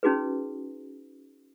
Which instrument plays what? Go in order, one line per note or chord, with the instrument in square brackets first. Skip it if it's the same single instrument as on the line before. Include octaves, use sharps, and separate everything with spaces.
[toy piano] C#4 D#4 F#4 G#4 B4